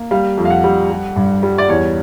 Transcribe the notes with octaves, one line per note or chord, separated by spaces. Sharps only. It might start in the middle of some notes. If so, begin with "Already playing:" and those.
Already playing: A#3
G3 F5
F2
F5
F#5
G3
G3
G2
G3
D5
E2 C#5